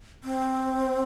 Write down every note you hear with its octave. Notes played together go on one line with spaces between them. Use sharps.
C4